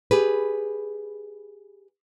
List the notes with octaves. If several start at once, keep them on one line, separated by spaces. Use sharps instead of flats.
G4 G#4 B4